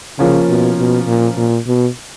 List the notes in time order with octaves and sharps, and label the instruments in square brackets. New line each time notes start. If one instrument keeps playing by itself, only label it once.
[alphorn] C#3 [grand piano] F3 A#3 C#4
[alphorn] B2
B2
A#2
A#2
B2